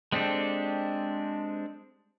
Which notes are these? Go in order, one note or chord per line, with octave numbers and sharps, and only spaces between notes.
G#3 C4 D4 G4 A4